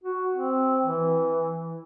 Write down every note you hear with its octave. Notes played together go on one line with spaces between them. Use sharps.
F#4
C4
E3